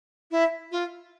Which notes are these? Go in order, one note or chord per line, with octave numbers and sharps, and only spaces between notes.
E4
F4